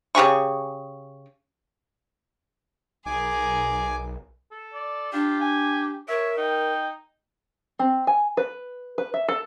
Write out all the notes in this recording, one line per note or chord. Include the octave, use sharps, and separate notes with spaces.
C#3 G4 G#4 C#6
B1 G#4 A#4 G#5 D6
A4
D5
D4 F4 G4
G#5
A#4 C#5 E5
D#4 G5
C4
G#5
B4
B4
E5
A4